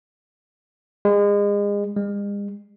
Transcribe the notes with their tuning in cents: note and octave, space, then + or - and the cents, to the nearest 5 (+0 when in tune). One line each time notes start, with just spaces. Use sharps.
G#3 -35
G#3 -45